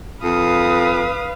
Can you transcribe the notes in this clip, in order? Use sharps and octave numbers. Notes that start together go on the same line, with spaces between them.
F2 B4 F5 D#6